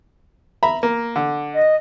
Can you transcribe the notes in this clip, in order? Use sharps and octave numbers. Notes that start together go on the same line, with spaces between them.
E5 A#5 B5
A#3
D3
D#5